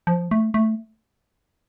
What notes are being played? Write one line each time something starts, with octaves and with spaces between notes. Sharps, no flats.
F3
A3
A3